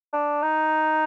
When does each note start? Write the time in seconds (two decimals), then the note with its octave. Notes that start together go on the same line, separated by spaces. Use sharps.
0.13 D4
0.42 D#4